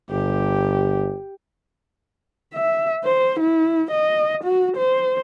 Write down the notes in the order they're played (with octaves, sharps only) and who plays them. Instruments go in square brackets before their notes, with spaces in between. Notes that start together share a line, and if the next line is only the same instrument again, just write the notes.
[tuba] G1 [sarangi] G4
[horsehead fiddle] E5
C5
E4
D#5
F#4
C5